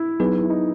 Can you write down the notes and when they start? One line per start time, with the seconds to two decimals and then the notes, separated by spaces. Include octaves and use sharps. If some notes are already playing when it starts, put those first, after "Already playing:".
Already playing: E4
0.20 F#3 B3 D#4 G#4 B4
0.39 E4
0.50 D#4